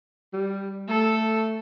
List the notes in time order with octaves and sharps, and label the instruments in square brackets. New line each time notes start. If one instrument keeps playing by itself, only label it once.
[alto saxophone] G3
[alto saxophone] A3 [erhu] A4